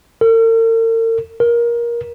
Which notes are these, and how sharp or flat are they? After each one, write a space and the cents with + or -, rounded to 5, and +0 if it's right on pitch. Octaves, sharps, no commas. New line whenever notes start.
A#4 -45
A#4 +20